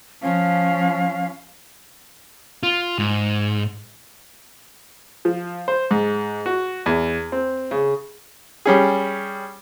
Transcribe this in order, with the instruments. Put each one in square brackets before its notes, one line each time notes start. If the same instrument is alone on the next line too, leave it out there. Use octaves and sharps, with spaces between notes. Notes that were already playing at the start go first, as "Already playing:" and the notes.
[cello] F3 C#4 [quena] F5
[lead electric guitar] F4
G#2
[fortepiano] F3
C5
G#2
F#4
E2
C4
C#3
G3 C#4 G#4